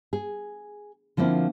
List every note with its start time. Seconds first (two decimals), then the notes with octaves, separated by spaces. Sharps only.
0.13 G#4
1.17 D3 F3 A#3 C4 E4